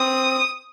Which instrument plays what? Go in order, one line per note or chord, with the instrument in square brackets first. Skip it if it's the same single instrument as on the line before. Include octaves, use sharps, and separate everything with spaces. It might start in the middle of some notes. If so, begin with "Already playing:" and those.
Already playing: [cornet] C4 [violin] D#6